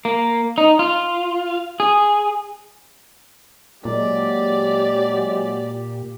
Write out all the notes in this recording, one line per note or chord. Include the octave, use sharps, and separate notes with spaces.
A#3
D#4
F4
G#4
A#2 F#3 G#3 G4 D5